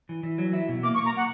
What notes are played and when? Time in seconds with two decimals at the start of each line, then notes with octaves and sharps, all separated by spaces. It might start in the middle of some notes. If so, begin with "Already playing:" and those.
0.09 E3
0.23 E3
0.38 F#3
0.53 E4
0.69 B2
0.83 A#3 D6
0.94 C#6
0.98 A#3
1.06 A#5
1.13 A#3 F#5